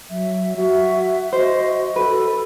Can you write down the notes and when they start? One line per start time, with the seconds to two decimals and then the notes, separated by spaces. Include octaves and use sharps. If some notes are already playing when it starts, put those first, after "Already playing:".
0.10 F#3 E5
0.56 F#4 E5
1.33 F#4 C5 D#5
1.96 A4 B4